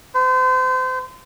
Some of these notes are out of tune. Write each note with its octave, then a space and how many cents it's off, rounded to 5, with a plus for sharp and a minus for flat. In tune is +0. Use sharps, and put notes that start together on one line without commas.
C5 -35